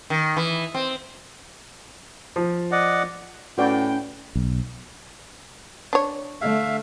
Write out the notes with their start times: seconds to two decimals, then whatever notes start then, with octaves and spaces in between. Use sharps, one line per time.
0.10 D#3
0.37 E3
0.74 C4
2.36 F3
2.72 D5 D#5 F#5
3.58 A2 C#4 F#4 B4 D5 G5
4.36 B1
5.93 D4 C#5
6.41 D3 A3 E5 F5